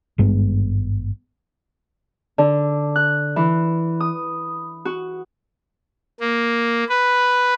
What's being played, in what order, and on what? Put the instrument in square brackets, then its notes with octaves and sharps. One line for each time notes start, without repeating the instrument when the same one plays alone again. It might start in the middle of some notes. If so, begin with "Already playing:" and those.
[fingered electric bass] G#1 G2 G#3 B3
[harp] D3
F#6
E3
D#6
F#4
[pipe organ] A#3
B4